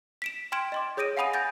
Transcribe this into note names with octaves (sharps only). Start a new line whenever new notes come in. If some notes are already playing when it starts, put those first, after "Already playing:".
B6 D7 E7
G5 C6 F6 G#6 D7 E7
D#5 C6 D6
G#4 C#5 D#6 A#6 D7 D#7
F5 F#5 G#5 B5 D#6 D#7
G#5 B5 G6 A6 A#6